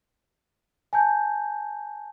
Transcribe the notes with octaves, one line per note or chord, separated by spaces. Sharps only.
G#5 A5 G6